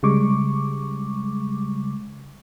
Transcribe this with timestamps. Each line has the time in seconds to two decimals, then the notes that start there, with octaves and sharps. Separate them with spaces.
0.03 C#3 G3 G#3 C#6 D6